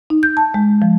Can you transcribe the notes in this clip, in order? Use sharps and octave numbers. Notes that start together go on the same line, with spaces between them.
D#4
G6
A5
G#3
F3